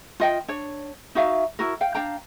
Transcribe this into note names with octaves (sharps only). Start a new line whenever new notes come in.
F4 D#5 G5
D4 C#5
D#4 F#4 E5 F5
E4 F#4 A#4
F5 G5
D4 F5 G5 A#5